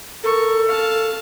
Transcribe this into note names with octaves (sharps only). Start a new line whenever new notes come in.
A4 A#4 C#6
F5 A5